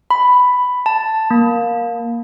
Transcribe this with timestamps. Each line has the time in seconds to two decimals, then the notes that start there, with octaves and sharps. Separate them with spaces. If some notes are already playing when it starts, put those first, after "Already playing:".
0.11 B5
0.86 A5
1.31 A#3